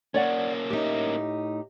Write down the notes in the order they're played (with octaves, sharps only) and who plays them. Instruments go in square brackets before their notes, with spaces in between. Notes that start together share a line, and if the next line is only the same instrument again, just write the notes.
[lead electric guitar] A#3 C#4 [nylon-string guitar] C#5 D5 F#5
[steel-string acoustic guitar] A2 D#4 [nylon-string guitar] G4